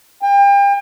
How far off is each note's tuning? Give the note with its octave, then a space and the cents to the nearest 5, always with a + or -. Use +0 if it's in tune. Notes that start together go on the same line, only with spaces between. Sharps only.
G5 +35